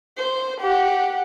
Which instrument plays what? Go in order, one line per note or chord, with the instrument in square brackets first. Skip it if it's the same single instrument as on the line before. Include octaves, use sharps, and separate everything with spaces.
[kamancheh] C5
G4 F#5